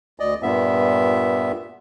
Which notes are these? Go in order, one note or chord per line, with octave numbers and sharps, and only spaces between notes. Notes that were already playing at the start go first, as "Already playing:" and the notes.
D2 D5 D#5
G2 A#2 B3 E5